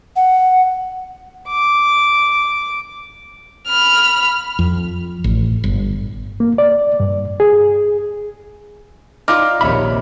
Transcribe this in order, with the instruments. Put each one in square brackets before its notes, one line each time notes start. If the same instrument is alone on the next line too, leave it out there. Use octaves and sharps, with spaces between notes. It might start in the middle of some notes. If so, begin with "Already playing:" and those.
[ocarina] F#5
[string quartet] D6
[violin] B5 F6
[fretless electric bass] F2
A1
G1
[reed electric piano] A#3
D5
G2
G#4
[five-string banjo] D#4 F4 D5 [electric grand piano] D6 F6
[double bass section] A#1 D#2 C3 [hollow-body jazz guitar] C#5 E5 B5